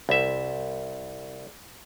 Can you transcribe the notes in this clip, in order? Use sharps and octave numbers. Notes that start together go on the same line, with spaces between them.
C2 E5